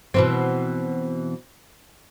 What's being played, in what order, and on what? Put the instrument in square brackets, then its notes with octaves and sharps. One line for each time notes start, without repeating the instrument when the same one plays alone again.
[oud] B2 E3 C4